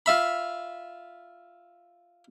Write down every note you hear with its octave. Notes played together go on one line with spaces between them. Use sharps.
F4 E5 B5